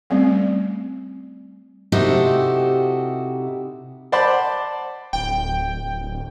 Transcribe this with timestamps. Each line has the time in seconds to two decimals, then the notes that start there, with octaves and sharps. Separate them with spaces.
0.10 G3 A3 C4 C#4
1.92 C3 D#4 E4 F#4 G4 A4
4.12 C5 D5 F#5 A5 B5 C6
5.13 D1 G5